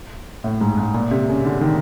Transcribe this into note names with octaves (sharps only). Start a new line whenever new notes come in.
A2
G#2
G#2
A#2
C3
C#3
D3
D#3